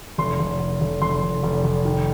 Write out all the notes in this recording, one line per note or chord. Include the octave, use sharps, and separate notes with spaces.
F1 C6
F1
F1
F1
F1 C6
F1
F1
F1
D#3